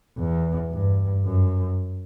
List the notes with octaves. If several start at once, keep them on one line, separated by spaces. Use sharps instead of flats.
E2
G2
F#2